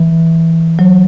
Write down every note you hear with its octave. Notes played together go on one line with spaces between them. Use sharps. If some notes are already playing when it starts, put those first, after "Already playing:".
Already playing: E3
F#3